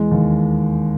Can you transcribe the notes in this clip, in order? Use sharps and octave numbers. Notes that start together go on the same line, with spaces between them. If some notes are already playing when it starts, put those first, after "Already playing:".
Already playing: E2 G#3
D#2